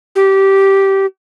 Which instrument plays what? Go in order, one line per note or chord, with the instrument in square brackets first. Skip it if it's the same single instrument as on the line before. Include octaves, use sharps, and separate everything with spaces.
[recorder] G4